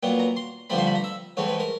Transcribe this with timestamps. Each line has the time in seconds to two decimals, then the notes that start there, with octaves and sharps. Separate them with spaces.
0.03 A#2 F#3 B3 G5
0.19 A#5
0.36 C6
0.70 G2 D3 F3 A3 C4 B5
0.78 C6
0.87 B5
0.95 A#5
1.04 E5
1.37 G#2 E3 A3 C4 C#5
1.48 B4
1.60 A#4